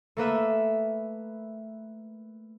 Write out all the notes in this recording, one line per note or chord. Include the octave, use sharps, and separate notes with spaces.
A3 A#3 B4 E5